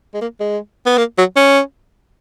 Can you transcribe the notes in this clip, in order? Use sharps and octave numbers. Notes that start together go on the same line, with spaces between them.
G#3
A#3
G#3
B3
A#3
F#3
C#4